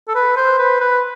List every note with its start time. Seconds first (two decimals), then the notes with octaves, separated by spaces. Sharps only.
0.08 A4
0.15 B4
0.37 C5
0.59 B4
0.80 B4